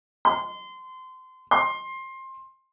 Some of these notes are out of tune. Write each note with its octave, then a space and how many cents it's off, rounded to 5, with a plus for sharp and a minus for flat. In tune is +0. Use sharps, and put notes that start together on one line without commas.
C6 -25
C6 +20